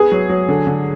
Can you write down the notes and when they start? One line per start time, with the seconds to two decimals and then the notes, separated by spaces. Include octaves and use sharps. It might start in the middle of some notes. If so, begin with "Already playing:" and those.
Already playing: B3 G#4
0.12 F#3
0.29 F#3
0.49 D3
0.67 D3